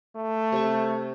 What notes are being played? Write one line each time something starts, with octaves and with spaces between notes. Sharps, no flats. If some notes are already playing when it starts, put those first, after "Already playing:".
A3
C3 C#6